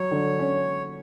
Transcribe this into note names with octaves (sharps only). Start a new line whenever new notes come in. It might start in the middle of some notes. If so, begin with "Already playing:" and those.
Already playing: F#3 C#5
D3
C#4